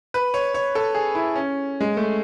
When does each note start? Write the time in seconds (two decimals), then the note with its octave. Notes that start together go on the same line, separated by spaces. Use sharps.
0.14 B4
0.34 C#5
0.54 C#5
0.75 A4
0.95 G#4
1.15 E4
1.36 C#4
1.81 G#3
1.97 A3